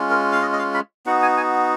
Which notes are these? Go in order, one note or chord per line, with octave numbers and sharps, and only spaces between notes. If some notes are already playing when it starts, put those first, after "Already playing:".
Already playing: G#3 C#4 F4
A#4
F5
D#5
D#5
F5
B5
B3 D#4 F#4 F#5
G#5
G#5